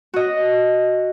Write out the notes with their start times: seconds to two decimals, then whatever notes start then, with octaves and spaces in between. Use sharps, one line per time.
0.14 F#4 D#5